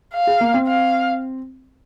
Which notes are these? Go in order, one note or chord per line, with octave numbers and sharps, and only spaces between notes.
F5
G#4
A#3
C4
F5